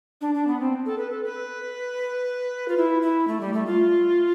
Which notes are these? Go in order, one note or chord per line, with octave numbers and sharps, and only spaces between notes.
D4
D4
B3
C4
A4
B4
A4
B4
F4
E4
E4
A3
G3
A3
F4